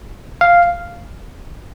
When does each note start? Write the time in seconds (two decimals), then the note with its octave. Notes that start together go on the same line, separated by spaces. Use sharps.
0.41 F5